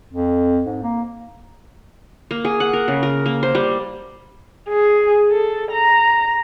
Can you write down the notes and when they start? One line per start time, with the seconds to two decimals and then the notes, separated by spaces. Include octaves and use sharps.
0.13 F2
0.66 G#2
0.83 A#3
2.31 A#3
2.45 G#4
2.60 F#5
2.73 A#4
2.88 C#3
3.03 A#4
3.26 A#3
3.43 C5
3.55 G3
4.69 G#4
5.31 A4
5.71 A#5